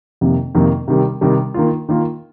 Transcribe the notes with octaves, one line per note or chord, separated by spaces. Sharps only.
F2 C3 D#3 A#3
F2 C3 D#3 A#3
C3 D#3 G3
C3 D#3 G3
D#3 A#3 F4
D#3 A#3 F4